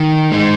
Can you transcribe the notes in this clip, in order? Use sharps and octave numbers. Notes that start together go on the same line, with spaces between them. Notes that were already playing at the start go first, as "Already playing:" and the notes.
Already playing: D#3
G#3 D#4